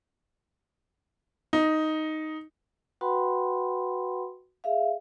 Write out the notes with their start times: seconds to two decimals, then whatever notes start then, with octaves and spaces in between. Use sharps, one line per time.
1.53 D#4
3.01 F#4 B4 F#5 G5 B5 C6
4.64 G#4 E5 F5